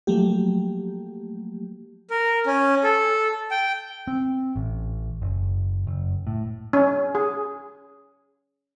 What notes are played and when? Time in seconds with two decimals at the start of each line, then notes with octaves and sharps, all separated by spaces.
0.07 F3 F#3 A3 A#3 G4
2.10 A#4
2.46 C#4
2.84 A4
3.51 G5
4.07 C4
4.56 A1
5.22 F#1
5.87 F#1
6.27 A2
6.73 C#4
7.15 G#4